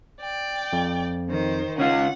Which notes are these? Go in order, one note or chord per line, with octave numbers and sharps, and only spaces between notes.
D5 G5
F2
D#3 C5
C#3 C#4 F4 F#5